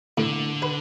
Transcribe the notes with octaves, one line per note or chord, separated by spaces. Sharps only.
A2 D3
B4